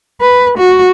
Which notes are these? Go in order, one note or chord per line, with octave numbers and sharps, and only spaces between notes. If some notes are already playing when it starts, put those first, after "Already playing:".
B4
F#4